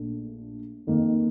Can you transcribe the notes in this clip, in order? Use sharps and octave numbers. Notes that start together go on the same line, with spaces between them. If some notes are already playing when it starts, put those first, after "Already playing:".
Already playing: A#1 A#2 A3 D4
F2 D#3 A#3